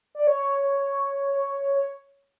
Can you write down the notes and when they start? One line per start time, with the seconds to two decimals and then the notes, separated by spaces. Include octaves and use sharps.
0.15 D5
0.27 C#5